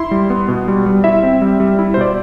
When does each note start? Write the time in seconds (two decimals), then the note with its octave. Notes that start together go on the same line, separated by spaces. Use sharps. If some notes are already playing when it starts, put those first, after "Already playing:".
Already playing: E4 C6
0.11 G3
0.30 B3
0.48 B2
0.68 G3
0.86 G3
1.04 E4 E5
1.23 C4
1.42 G3
1.60 G3
1.79 E4
1.94 C5
1.97 B2 D5